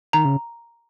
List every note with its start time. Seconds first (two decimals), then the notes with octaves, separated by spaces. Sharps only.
0.13 D#3 A#5
0.25 C#3